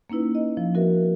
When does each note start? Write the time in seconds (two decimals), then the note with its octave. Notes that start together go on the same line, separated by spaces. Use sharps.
0.10 A#3 C#4 D#4 E4 B4
0.35 D#5
0.57 F3
0.74 C4 F#4 A#4 B4 E5